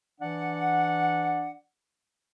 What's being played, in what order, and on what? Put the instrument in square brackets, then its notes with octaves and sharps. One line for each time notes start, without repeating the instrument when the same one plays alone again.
[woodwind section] E3 D4 D5 F#5